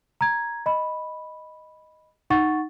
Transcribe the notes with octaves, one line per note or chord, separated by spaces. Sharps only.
A#5 G#6
D#5 B5
D#4 F#5 C#6 A6